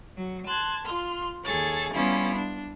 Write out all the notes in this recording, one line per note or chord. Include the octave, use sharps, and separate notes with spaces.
F#3
A5 C6 F#6 G#6
F4 C6 F6
D#2 G#4 A4 C#5 A6
G3 B3 C#4 E4 F4
D4